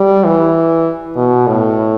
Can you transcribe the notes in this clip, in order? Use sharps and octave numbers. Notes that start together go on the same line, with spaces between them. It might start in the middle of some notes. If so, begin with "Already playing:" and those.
Already playing: G3
E3
B2
A2